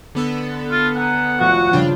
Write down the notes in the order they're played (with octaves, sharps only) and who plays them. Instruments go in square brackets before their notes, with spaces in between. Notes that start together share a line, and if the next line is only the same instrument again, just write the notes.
[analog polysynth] D3 B3 A4
[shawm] F4
[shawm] F#5 [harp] G#5 A#5 D#6
[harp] F1 F3 [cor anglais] F#4
[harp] G2 C#3 F3 [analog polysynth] D4 F4 G5